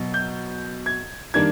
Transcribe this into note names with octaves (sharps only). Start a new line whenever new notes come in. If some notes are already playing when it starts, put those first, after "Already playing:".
Already playing: B2 F#3
G6
G#6
D#3 G3 A#3 D4 G#6